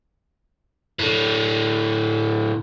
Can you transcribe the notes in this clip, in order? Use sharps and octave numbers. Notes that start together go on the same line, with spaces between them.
A2 D3